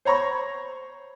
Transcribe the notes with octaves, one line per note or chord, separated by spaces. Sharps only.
C5 C#5 A#5 B5 C#6